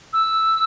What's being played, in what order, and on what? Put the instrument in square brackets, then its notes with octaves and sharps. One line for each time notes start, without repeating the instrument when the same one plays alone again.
[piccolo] E6